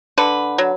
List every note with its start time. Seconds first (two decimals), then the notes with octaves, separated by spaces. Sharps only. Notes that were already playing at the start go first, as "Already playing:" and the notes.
0.18 D3 B4
0.58 F#3